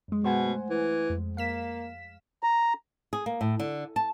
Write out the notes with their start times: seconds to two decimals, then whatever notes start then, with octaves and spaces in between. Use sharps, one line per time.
0.08 F#2 G#3
0.24 B2 C5 F#5 G#5
0.46 A3
0.70 E3
1.10 F2 G#3
1.37 A#3 F5 B6 E7
2.43 A#5
3.13 G#4
3.26 A#3
3.41 A2
3.60 D3
3.96 A5